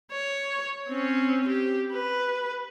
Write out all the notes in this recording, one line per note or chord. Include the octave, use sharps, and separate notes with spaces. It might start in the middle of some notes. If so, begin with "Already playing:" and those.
C#5
C4 C#4
G4
B4